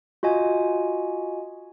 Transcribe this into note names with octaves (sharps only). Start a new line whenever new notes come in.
F4 F#4 D#5 G#5